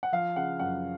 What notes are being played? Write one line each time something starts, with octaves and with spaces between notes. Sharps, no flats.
F#5
F3 F5
C#3 F#5
F#2 F#5